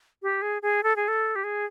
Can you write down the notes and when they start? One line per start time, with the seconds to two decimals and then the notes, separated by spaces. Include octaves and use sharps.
0.22 G4
0.42 G#4
0.62 G#4
0.83 A4
0.96 G#4
1.08 A4
1.36 G4
1.44 G#4